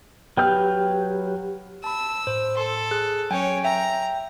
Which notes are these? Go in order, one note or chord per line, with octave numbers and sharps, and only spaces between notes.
F#3 G4 B4 G5 F6 G6
A5 B5 E6
A2 C5
A4 C6
G#4 F#6
F#3 C#4 C#5 G5 G#5
E5 G5 A#5